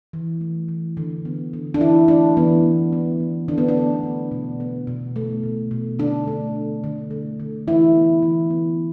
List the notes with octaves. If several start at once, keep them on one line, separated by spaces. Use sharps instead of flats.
E3
A3
E3
D3
B3
D3
D4
E3 E4
A3 D4
E3 B3
E3
B3
E3
D3 D4
B3
D4
A3
D3
B2
B3
B2
A3
B2
B2
D3 D4
A3
D3
D3
A3
D3
E3 E4
B3
E3
B3